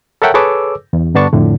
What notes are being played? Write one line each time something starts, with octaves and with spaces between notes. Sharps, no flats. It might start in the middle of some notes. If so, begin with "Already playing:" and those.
A4 A#4 C#5 E5 F#5 G5
G#4 A4 B4 C#5 D6 E6
E2
G2 D3 B3 D4 A5 C#6
F2 A2 D3